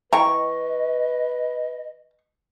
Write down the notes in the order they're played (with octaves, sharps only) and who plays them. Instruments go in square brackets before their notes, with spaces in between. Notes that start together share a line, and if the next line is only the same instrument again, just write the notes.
[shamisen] E3 G5 A#5 [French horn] B4 [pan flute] D#5 [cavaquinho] C#6